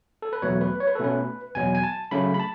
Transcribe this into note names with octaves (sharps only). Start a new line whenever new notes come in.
A4
B4
E2 B2 F#3 A3 C#5
B4
C#5
B4
A4
B2 A3 C#4 B4
E2 B2 F#3 G#5
G#5
A5
C#3 F#3 A3 C#4 B5
B5
A5